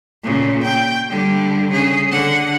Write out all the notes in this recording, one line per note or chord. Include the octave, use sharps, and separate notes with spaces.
A#2 C#3
G5
D3 G3
C#3 G#4
D3 F#5